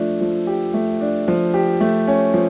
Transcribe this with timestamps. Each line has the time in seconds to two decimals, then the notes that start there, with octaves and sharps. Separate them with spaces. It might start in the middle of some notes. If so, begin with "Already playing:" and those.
Already playing: F3 A3 D4
0.21 F3
0.47 G4
0.74 A3
1.01 D4
1.28 F3
1.54 G4
1.80 A3
2.07 C#4
2.34 F3